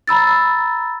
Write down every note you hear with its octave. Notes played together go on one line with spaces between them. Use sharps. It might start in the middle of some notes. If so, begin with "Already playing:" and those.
A#5 B5 E6 A6